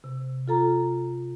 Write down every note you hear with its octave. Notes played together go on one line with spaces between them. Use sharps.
C3
F4 A4 A#5